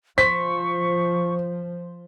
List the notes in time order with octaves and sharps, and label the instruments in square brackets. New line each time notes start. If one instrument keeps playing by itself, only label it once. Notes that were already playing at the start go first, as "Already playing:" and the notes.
[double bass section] F3 [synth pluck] C5 [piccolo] C#6 [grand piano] B6